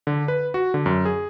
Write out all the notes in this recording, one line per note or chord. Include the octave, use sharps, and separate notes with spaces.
D3
B4
F#4
D3
F#2
G#4